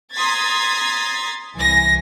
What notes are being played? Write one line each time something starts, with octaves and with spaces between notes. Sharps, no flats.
A#5 C6 D#6 G#6 A6 B6
C2 E3 G#5 A#6